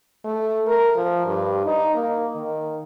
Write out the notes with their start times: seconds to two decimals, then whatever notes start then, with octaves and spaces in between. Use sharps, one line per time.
0.24 A3
0.67 A#4
0.96 F3
1.26 G2
1.66 D#4
1.95 A#3
2.36 D#3